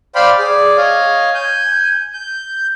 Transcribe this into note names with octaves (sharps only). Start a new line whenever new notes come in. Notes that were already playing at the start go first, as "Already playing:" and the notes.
C5 D5 F5 G5 B5 C6
G#4 D5
C#5 D#5 F5
G#5 G6
G6